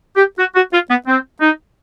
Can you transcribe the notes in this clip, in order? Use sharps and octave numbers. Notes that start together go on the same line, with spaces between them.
G4
F#4
F#4
F4
B3
C4
D#4